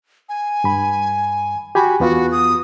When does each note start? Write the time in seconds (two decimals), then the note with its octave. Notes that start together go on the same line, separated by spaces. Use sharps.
0.29 G#5
0.64 G2 B5
1.75 F#4 G4 G#5 B5
2.00 E2 B3 F4 F#4
2.32 D#6